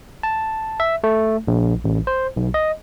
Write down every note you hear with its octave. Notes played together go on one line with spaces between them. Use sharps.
A5
E5
A3
A#1
A1
C5
B1
D#5